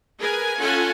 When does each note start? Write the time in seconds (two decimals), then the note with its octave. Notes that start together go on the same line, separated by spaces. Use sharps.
0.19 G#4 A#4 B4 G#5
0.60 C#4 F4 A4 F#5 G#5